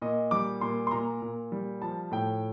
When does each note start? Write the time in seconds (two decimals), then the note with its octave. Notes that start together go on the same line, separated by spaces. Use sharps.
0.02 A#2 D#5
0.31 G3 D6
0.61 A#2 C6
0.87 C6
0.91 A#2 A#5
1.22 A#2
1.52 G3
1.82 F3 A5
2.12 A2 G5